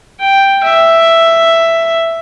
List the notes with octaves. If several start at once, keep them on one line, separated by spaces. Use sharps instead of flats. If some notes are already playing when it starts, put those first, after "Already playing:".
G5
E5